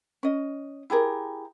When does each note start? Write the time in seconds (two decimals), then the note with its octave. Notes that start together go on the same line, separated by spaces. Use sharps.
0.23 C#4 D#5
0.90 E4 G4 G#4 A#4